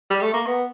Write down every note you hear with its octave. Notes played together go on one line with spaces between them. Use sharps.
G3
A3
A#3
B3